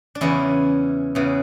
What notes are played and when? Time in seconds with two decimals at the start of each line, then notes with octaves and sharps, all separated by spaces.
0.15 D4
0.21 E2 C#3 E3 C#4 E4
1.15 E2 C#3 E3